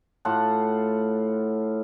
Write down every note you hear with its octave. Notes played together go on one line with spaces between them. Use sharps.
A2 F4 F#5 A5